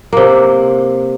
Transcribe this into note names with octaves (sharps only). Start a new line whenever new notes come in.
C3 A#3